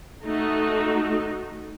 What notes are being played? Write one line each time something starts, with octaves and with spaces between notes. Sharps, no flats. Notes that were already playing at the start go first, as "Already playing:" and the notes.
A3 D#4 F#4